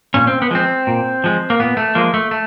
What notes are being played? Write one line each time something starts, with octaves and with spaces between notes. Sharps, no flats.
A#2 C#4
C4
B3
F3 G#3 C4
A#2
F3 G#3
A#3
A#2 B3
A3
F3 G#3 A#3
A3
A3